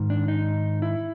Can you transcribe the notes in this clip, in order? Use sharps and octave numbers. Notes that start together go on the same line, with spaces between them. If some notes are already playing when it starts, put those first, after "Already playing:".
Already playing: G#2 D#3
D4
D#4
E4